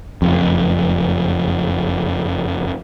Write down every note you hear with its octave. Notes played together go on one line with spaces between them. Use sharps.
F#1 F2